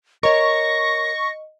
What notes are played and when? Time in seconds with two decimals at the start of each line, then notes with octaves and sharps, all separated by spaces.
0.23 A#4 C#5 D#5 C#6 A#6